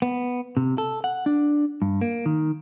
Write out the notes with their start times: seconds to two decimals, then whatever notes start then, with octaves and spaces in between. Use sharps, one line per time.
0.02 B3
0.57 C3
0.78 A4
1.04 F#5
1.26 D4
1.82 G2
2.01 A#3
2.26 D#3